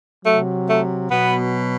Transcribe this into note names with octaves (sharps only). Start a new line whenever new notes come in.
C3 F#3 A3
A3
B2 F#3 B3